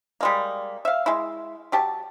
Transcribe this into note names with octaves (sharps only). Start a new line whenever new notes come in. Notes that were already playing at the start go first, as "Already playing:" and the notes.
G3 G#3 A#3
E5 F5
G#3 E4
F#3 G4 A5